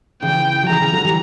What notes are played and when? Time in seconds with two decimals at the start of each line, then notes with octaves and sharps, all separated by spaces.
0.22 C#3 E3 G5
0.63 F#3
0.69 C#3 E3 A#5
0.80 C#3 E3
0.92 D3 F#3
1.04 E3 G3